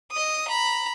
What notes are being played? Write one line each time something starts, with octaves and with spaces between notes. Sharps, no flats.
D#5 D#6
A#5 B5